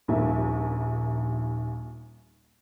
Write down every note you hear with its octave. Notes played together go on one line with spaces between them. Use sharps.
D#1 A#1 D#2 A#4 E5